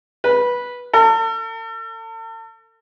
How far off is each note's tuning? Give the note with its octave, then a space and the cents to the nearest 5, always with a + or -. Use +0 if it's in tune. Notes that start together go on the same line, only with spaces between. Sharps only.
B4 -15
A4 +40